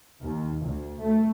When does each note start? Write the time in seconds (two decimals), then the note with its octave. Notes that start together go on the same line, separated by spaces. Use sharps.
0.21 D#2
0.62 D2
1.00 A3